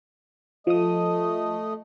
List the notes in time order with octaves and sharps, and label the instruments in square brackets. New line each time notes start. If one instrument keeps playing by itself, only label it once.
[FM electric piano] F3 D#6 [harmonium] A3 D#5